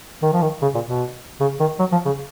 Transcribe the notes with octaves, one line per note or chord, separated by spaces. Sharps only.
D#3
F3
D#3
C#3
A#2
B2
C#3
D#3
F#3
F3
C#3